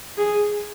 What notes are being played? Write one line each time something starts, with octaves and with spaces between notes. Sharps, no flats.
G#4